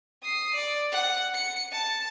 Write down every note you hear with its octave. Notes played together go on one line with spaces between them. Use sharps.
D#6 C7
D5
F#5
C#7
A5